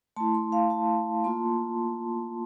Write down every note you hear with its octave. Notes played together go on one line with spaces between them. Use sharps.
A3 E4 A5 C6
A5 C6
F5 A5
F5 A5
A#3 F4 A5 C6